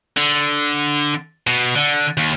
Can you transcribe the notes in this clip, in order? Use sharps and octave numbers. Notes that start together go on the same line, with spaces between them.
D3
B2
D3
D#2